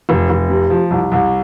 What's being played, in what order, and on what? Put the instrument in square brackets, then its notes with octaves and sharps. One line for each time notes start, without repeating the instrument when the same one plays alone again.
[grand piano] F1
F1
C3
F3
C2
C2